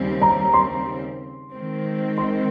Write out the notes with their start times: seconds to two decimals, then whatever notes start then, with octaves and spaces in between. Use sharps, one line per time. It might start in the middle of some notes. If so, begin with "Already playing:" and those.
Already playing: D#2 C#3 G3 C4
0.22 A#5
0.54 C6
1.53 D#3 G#3 C4
2.18 C6